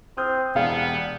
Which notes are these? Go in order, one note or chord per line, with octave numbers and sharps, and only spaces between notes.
C4 D#6 F6 G6
E1 G3 B3 F5